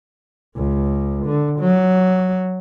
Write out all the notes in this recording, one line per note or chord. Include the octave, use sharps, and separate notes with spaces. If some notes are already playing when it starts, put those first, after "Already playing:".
C#2
D3
F#3